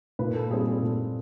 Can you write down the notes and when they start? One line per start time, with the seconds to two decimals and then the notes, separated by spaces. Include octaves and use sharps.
0.19 A#2 B4
0.35 A4
0.51 G3 C4 G#4
0.66 G#4
0.82 A#2 A4